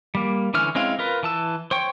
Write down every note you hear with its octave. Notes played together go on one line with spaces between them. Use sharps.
G3 A#3
D3 E3 C#4 F6
G#3 C4 C#4 E4 F5
F4 A#4 B4
E3 A5 E6
C5 C#5 G5 C#6